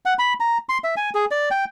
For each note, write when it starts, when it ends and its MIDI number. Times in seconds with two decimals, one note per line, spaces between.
0.06 0.14 78
0.19 0.34 83
0.40 0.58 82
0.69 0.78 84
0.84 0.95 76
0.97 1.10 80
1.15 1.25 68
1.31 1.49 74
1.51 1.65 79